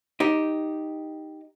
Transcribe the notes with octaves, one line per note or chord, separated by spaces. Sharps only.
D#4 G4